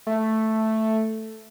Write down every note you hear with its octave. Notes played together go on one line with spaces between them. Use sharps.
A3